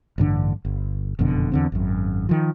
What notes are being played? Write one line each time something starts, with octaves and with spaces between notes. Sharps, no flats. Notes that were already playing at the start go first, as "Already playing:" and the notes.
A1 G2 D3 D4
G1
F#1 F2 B2 D3
E2 D3 C4
G#1 F#2
D#3 F3